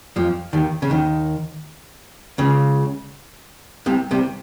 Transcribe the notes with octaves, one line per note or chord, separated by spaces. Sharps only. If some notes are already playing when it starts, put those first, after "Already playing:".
F2 F3
D#2 D#3
C#3
D#2 D#3
C#2 C#3
C2 C3
C2 C3